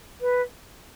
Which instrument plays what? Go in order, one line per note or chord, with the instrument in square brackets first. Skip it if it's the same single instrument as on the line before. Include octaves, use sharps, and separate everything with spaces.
[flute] B4